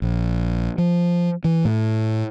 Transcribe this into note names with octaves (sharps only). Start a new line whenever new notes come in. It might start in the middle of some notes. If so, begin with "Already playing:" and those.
A#1
F3
E3
A2